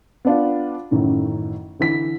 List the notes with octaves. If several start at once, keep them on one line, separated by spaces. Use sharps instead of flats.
B3 D4 F4
A1 F#2 A2 D#3
D3 E3 B6